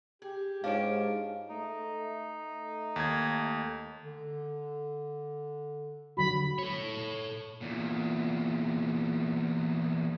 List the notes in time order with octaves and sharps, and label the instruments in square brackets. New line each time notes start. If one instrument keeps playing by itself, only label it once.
[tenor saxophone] G4 [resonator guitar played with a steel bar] G#4
[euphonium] G#2 [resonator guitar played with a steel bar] D4 F4 C#5 [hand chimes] F5 D7
[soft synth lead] A3 [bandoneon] D#4
[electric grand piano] D#2 G#6
[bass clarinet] D3
[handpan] D3 F#3 F#4 [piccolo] B5
[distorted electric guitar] A4 C#5
E2 A#2